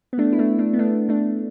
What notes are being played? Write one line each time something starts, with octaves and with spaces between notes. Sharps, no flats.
B3
A3 D4
E4
A3 D4
A3 D4
B3
A3 D4
A3 D4